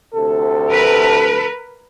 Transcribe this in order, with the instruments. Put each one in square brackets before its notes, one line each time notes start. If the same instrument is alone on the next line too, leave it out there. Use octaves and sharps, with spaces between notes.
[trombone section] D2 C3 A4
[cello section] A#4 B4